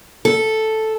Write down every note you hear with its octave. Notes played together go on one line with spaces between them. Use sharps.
A4